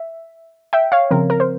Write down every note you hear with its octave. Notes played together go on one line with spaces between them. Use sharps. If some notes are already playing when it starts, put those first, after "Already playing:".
Already playing: E5
E5 G5
C#5 F5
C#3 F3 C4 A#4
A#4
C5